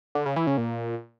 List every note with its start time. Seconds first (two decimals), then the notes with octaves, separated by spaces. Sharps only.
0.15 D3
0.26 C#3
0.36 E3
0.47 C#3
0.57 A#2